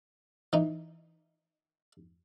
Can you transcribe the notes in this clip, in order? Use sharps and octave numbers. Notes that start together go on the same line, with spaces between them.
E3 D#4